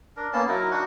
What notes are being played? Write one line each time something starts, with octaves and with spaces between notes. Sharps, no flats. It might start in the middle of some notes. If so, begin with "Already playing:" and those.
D4 A#4
A#3 B3 C#4 A5
F#3 D#4 E4 A#4
D4 D#4 F#4 F#5